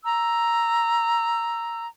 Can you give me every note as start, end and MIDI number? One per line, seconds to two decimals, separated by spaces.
0.04 1.86 82
0.04 1.86 88